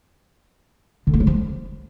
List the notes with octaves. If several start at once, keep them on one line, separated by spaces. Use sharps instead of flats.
D3
A#3
F#3
F3